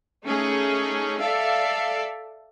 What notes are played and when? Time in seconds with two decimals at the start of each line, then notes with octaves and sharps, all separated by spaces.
0.24 A3 C#4 D#4 G#4
1.19 A4 D5 E5 F5